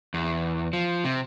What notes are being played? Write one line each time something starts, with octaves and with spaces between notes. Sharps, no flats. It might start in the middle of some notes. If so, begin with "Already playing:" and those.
E2
F3
C3